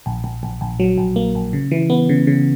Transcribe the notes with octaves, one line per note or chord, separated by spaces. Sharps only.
A#1
A#1
A#1
A#1
F#3
A#1
A#3
A#1
C#3
E3
B3
C#3
C#3